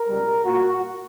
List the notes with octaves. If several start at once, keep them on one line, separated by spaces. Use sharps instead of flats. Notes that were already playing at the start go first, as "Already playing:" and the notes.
Already playing: A#4
C#2 B2 G3
A#2 A#3 F#4